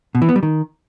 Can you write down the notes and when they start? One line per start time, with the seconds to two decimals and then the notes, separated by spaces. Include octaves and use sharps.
0.15 B2
0.22 E3
0.29 B3
0.36 G3
0.43 D#3